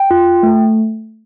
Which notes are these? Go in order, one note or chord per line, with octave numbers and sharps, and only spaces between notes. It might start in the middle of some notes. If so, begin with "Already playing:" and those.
Already playing: G5
F4
A3